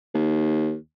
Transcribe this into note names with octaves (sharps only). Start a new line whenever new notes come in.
D#2